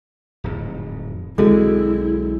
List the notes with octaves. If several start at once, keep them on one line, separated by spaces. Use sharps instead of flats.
D1 F2 G#2
B1 D3 G#3 C4 E4 F#4 A4